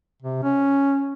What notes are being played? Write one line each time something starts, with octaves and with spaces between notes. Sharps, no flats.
C3
C#4